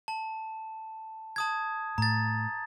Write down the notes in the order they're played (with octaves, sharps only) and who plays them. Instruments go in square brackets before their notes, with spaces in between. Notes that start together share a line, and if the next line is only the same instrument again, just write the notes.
[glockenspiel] A5
A5 D#6 G#6
[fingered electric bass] A2 [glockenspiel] A#5 A6